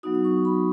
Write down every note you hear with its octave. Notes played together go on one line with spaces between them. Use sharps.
F#3 B3 D#4 F#4 D#6
D#6
C#6
B5